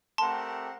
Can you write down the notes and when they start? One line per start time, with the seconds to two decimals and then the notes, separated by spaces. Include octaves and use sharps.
0.18 A3 C4 G4 A#4 F#5 A5 C6